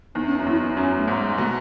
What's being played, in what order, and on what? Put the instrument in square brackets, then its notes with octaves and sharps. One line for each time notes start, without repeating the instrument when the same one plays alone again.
[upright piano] E2 [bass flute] D#4
[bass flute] C#4
[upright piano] F#2 [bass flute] D#4
[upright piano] E2 [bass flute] E4
[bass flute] D#4
[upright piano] F#2 [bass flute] C#4
[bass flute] A3
[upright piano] G#2
[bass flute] G#3
[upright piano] B2 [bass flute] A3